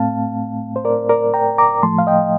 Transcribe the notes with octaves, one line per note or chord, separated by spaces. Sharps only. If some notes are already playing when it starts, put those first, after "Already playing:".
Already playing: A2 A3 C4 F5 A5
C5
A#4 D5
A#4 D5
G5 A#5
A#5 D6
A2 F3 A3 A5 C6
F5
D#5 G5